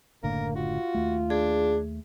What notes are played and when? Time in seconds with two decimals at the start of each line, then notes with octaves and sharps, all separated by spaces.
0.23 F#1 A2 D3 A#3 A#4
0.56 F4 F#4
0.94 D#2 A3
1.30 D4 G#4